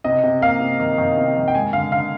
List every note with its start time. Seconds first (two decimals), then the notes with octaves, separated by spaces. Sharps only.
0.04 C3 D#5
0.23 C3
0.41 A#3 F5
0.60 C3
0.80 D#3
0.98 D#3
1.17 C3
1.36 D#3
1.48 G5
1.55 G#3 G#5
1.73 D3 F5
1.92 D3 F5